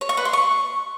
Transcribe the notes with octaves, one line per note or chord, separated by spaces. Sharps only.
C#5
C#6
B4
C6
C#6